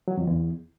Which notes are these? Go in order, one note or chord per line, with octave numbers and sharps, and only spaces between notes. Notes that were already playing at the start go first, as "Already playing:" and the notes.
F#3
F2
E2